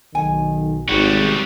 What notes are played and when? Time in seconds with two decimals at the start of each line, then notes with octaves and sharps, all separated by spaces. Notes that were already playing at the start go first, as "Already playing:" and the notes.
0.15 B1 D#3 G#5
0.89 G#1 G3 F#4